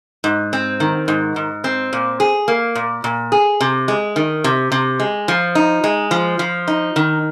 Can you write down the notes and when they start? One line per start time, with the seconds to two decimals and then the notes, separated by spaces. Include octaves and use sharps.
0.24 G#2
0.53 C4
0.80 D#3
1.08 G#2
1.36 G#2
1.64 C4
1.93 A#2
2.20 G#4
2.48 A#3
2.75 A#2
3.04 A#2
3.32 G#4
3.61 C3
3.88 G#3
4.16 D#3
4.44 C3
4.72 C3
5.00 G#3
5.28 F3
5.55 D#4
5.84 G#3
6.11 F3
6.39 F3
6.68 D#4
6.96 D#3